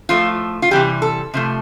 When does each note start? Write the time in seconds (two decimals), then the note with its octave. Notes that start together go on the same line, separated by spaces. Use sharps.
0.09 A2 F3 A3 F4
0.62 F4
0.71 C3 E3 G3 G4
1.02 A4
1.34 C3 F3 A3